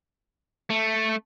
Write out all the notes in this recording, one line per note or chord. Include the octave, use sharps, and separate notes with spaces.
A3